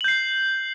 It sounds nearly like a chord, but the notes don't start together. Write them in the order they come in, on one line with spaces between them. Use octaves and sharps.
F#7 G6 C7